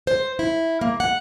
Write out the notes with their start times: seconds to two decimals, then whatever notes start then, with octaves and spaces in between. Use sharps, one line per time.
0.07 C5
0.39 E4
0.81 A#3
1.00 F#5